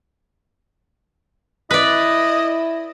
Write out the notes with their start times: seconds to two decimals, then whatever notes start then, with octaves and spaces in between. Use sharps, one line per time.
1.71 E4 B4 D5 D#5